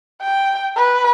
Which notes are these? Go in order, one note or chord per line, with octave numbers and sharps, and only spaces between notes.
G5
B4